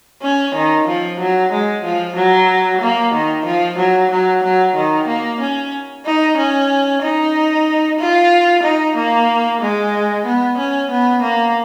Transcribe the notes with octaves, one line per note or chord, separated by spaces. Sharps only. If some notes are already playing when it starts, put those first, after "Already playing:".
C#4
D#3
F3
F#3
G#3
F3
F#3
A#3
D#3
F3
F#3
F#3
F#3
D#3
A#3
C#4
D#4
C#4
D#4
F4
D#4
A#3
G#3
B3
C#4
B3
A#3